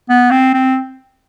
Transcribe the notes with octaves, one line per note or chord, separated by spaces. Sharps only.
B3
C4
C4